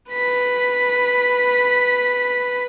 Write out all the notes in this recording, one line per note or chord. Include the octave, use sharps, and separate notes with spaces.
B4 B6